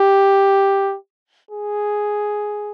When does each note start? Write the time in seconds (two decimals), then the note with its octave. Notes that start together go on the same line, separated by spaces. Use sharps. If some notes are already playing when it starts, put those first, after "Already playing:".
Already playing: G4
1.51 G#4